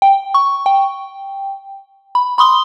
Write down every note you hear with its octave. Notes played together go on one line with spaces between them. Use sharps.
G5
C#6
G5
B5
B5 C6 D#6 G7